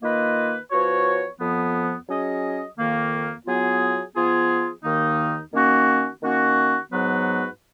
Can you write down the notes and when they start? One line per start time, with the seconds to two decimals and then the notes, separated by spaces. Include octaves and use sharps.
0.01 D#3 A#3 F4 B4 D#5
0.70 F3 B3 F#4 C#5
1.39 F2 F3 B3
2.08 F#3 C#4 G#4 D#5
2.77 F2 D#3 A#3
3.46 F#3 B3 F4 G#4
4.15 F3 B3 F4 G#4
4.83 D#2 D#3 A#3 D#4
5.53 D#3 A#3 C#4 F#4
6.22 D#3 A#3 C#4 F#4
6.91 G#2 F#3 B3 F#4 B4